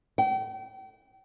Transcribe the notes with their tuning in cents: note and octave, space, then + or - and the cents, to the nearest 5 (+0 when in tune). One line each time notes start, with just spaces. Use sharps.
G5 -40